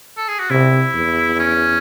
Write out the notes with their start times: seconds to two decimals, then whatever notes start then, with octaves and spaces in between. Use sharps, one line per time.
0.17 A4
0.28 G#4
0.39 F#4
0.50 C3 E4
0.94 E2
1.39 C#4